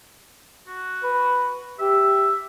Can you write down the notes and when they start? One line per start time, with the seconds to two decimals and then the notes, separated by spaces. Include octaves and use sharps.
0.67 F#4
1.03 B4
1.79 G4 E5